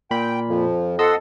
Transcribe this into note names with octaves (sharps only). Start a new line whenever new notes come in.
A#2 G5 B5
F2 F3
A4 D#5 F#5 C6 E6